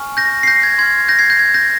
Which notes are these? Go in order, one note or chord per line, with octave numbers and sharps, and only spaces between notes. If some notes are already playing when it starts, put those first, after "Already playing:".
Already playing: G#5 C#6 F6
G6 A#6
C7
G6 A#6
G#6
C6 F6 G#6
G6 A#6
G#6 C7
G6
G#6
G6 A#6